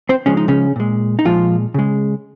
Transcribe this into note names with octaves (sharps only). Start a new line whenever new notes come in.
C4 C5
C#3 F3 G#3 C#4
D#4
C#3 C#4
A#2 G#3
D#4
A#2 F3 G#3 F4
C#3 G#3